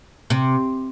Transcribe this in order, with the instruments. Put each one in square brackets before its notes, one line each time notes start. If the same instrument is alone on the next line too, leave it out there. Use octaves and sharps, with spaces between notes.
[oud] C3